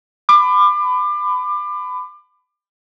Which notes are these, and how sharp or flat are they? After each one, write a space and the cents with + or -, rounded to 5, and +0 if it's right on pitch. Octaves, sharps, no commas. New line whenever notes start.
B5 +25 D6 +25